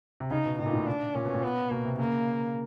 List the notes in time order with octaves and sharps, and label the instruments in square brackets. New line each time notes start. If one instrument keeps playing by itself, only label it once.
[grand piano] C3
[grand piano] C#3 [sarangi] D#4
[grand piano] B2
[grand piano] A2 [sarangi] D#4
[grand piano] A#2
A2
[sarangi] D4
[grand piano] A#2 [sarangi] C#4
[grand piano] B2
A#2
[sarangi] B3
[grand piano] B2 [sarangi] A#3
[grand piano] C3
[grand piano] C#3 [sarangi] A#3